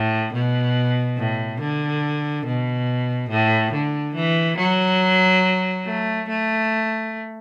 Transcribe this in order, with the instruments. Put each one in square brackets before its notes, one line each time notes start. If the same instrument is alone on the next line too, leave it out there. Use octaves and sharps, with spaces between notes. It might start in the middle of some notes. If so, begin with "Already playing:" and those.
Already playing: [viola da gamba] A2
B2
A2
D3
B2
A2
D3
E3
F#3
A3
A3